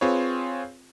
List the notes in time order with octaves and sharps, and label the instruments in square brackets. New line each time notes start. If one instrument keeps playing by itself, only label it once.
[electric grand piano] C4 F4 G#4 B4 C#5